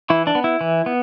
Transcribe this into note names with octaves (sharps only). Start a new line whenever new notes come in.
E3 E4
D4
B3
E4
E3
B3